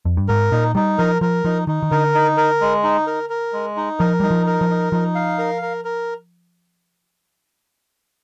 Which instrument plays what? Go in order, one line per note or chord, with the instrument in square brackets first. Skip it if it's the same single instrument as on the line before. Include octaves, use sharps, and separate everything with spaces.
[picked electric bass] F2
G2
[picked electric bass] G#2 [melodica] A#4
[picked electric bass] A#2 [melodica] D#4
[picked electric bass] G3 [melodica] D#4
[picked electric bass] F3 [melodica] A#4
[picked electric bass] F3 [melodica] A#4
[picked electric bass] F3 [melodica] D#4
[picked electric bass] D#3 [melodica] D#4
[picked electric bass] D#3
[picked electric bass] D3 [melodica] A#4
[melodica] D#4
A#4
G#3
D#4
A#4
A#4
G#3
D#4
[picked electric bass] F3 [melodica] A#4
[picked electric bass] G3 [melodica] D#4
[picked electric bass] F3
[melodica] A#4
[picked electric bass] F3
[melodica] D#4
[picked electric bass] F3 [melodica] D#4
[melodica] F5
A#4
A#4
A#4